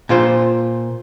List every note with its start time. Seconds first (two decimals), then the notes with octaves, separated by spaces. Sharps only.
0.09 A#2 F4 C5